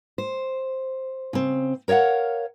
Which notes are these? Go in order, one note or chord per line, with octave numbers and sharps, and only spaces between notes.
C5
C#3 C4
A#4 C#5 D5 F5 F#5